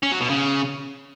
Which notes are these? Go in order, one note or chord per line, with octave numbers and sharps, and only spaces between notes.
C#4
F#3
B2
C#3